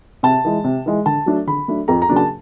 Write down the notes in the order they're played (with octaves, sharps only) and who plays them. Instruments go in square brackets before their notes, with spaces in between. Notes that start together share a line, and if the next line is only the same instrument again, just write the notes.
[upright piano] C3 A5
E3 G#3
C3
E3 G#3
D3 A5
F#3 A3 D4
D3 B5
F#3 A3 D4
F2 A#5
A#5
C#3 F#3 A#3 D4
A5